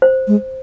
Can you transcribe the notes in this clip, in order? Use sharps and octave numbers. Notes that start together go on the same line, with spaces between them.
C5
G#3